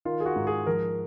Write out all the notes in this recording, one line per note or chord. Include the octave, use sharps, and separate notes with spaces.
D#3 F4
G#4
F#4
G#2
G#4
F3 A#4